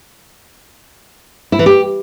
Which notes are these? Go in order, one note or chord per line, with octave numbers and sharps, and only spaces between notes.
E4
E3
G4